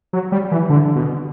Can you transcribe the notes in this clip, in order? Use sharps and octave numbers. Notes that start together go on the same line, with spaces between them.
F#3
G3
E3
D3
B2